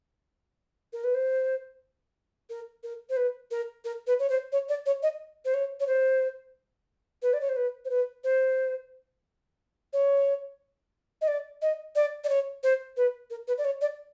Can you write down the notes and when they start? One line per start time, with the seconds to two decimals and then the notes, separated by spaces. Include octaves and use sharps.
0.93 A#4
1.04 B4
1.14 C5
2.49 A#4
2.83 A#4
3.09 C5
3.16 B4
3.51 A#4
3.84 A#4
4.07 B4
4.19 C#5
4.30 C5
4.52 C#5
4.69 D5
4.86 C#5
5.03 D#5
5.45 C5
5.54 C#5
5.80 C#5
5.87 C5
7.22 B4
7.33 D5
7.41 C#5
7.49 C5
7.56 B4
7.85 C5
7.90 B4
8.24 C5
9.93 C#5
11.21 D#5
11.28 D5
11.62 D#5
11.95 D5
12.24 D5
12.29 C#5
12.63 C5
12.97 B4
13.30 A#4
13.47 B4
13.58 D5
13.65 C#5
13.81 D5